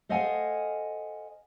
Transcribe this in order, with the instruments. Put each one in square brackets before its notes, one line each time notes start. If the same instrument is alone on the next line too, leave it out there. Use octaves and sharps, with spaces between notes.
[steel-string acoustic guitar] A4 C5 D#5 F5 F#5 G#5